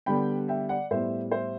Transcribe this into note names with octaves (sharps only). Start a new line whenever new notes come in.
D3 G3 B3 G5 B5
E5 G5
D5 F#5
A2 G3 B3 C5 E5
C5 E5